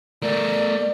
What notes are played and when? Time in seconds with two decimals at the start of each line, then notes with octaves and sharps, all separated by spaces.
0.22 A3 A#4 D5